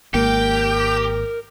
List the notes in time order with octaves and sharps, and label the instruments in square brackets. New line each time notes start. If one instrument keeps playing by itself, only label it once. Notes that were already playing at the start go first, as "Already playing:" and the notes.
[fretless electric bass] G#1 G#2 A#3 [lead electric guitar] G4 [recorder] A#4 [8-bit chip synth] G5